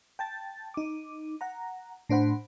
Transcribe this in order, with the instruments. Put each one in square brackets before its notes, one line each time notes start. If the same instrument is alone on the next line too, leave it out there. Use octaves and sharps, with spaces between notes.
[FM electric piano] G5 A5 A6
D#4 D6
F#5 A#5
A2 D4 C5 F#5 B5